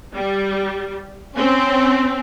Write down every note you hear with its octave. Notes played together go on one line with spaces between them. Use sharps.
G3
C4 C#4